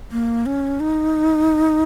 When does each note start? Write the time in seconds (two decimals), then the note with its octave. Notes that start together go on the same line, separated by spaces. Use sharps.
0.12 A#3
0.46 C#4
0.80 D#4